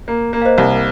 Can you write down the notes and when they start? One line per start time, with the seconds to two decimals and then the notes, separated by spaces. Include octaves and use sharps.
0.08 A#3
0.33 A#3
0.41 F5
0.45 C5 D#5
0.58 C2